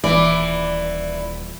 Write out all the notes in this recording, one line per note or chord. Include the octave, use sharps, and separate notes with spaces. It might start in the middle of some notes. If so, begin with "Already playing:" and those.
D#1 E3 D5